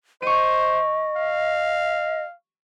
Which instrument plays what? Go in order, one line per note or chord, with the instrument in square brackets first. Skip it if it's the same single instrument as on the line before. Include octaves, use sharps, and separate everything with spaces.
[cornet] C5 [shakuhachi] D#5 [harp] C#6 D#7
[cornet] F5